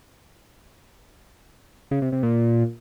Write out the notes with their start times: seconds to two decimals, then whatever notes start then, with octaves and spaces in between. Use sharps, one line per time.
1.91 C#3
2.02 C3
2.12 C3
2.23 A#2